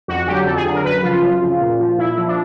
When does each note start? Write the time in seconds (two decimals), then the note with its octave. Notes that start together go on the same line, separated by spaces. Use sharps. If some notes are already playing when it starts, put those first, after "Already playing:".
0.08 F2 F#4
0.27 D3 F#3 G4
0.46 F2 A4
0.56 G#4
0.66 D3 F#3
0.75 A#4
0.84 F#2 B4
1.03 C#3 F3 F4
1.23 F#2
1.41 C#3 F3
1.60 A#2
1.80 F3
1.98 A#2 E4
2.18 F3
2.28 D4